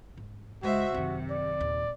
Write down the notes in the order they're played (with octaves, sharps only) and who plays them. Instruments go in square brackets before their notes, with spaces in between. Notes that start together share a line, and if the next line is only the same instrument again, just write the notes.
[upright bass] G#2
[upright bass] C#2 [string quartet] G#3 C5 E5 [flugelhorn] F#4
[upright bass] F#2 D#3 [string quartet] C3
[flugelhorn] D5
[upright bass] D#2 A#2